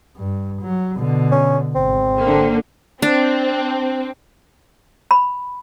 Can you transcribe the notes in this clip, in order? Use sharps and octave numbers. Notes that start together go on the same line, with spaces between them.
G2
F#3
B2 D3
C#4
G#1 C4
D3 A#3
C4 D4
B5